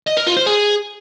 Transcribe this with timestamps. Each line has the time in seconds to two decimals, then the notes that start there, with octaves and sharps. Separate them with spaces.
0.07 D#5
0.17 A#4
0.27 F4
0.37 C5
0.47 G#4